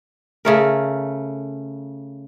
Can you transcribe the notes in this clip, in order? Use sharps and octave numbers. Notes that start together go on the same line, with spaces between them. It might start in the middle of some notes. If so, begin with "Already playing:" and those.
C#3 A3 A#4